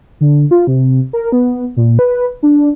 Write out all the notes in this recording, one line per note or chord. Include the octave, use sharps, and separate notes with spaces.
D3
F4
C3
A#4
B3
A#2
B4
D4